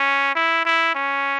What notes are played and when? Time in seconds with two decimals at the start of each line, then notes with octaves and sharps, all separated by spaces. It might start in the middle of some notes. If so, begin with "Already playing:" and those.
Already playing: C#4
0.36 E4
0.65 E4
0.95 C#4